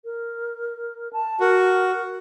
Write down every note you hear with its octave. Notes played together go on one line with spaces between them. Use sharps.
A#4
A5
F#4 A#4